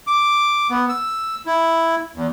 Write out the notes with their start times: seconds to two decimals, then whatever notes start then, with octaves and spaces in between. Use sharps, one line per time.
0.07 D6
0.70 B3
0.89 E6
1.46 E4
2.16 E2